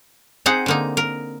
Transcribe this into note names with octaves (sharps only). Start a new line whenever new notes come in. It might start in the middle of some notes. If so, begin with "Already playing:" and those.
C4 D#4 G#4 F#5
D3 A#3 D#4
A#4